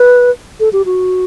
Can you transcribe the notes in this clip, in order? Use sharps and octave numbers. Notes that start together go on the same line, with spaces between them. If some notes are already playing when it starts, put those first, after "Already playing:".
Already playing: B4
A4
G4
F#4